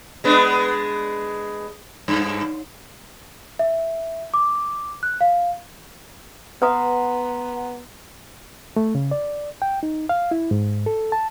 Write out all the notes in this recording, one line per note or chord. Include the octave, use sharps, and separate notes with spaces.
G#3 B3 D4
G2
E5
D6
F#6
F5
B3 B4 F#5 A#5 C6 D#6
A3
C#3
D5
G5
D#4
F5
E4
G#2
A4
A5